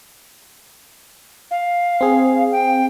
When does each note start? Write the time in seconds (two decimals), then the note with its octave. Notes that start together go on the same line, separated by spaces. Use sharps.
1.51 F5
2.01 C4 G#4
2.52 G5